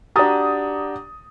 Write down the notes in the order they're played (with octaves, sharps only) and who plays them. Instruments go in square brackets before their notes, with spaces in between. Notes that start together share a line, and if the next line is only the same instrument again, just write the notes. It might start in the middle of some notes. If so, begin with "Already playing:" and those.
[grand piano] D4 F#4 G4 [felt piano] A#5 D#6 A6